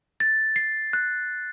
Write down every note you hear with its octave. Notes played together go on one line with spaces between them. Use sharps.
A6
C7
F#6